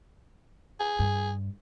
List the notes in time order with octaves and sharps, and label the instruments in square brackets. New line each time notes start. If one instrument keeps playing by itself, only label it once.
[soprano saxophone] G#4
[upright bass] G2